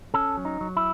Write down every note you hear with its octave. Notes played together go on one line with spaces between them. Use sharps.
C#4 A4
F#3
D#4
F#3
E4